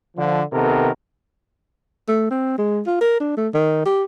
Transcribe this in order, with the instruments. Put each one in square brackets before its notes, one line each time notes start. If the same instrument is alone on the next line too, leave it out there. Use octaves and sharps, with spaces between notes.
[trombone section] D3 F3
C3 D#3 B3 A4 A#4
[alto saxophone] A3
C4
G#3
F4
A#4
D4
A3
D#3
G4